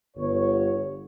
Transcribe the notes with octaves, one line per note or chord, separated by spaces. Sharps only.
G1 C#5